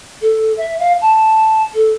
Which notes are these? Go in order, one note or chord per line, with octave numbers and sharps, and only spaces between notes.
A4
E5
F5
A5
A4